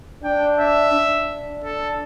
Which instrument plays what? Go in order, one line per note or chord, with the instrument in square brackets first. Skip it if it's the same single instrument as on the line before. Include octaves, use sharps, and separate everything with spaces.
[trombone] D4 [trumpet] G5
[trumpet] E5
[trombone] D4
[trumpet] A4